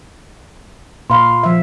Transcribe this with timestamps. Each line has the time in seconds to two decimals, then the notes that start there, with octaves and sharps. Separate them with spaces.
1.10 A#2 F5 B5 C6
1.43 F3 E5